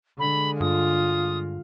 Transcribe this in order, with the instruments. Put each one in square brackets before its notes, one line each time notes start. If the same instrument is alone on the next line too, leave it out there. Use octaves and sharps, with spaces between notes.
[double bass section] D3 G#3 [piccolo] B5
[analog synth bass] G2 [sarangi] F4 [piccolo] D#6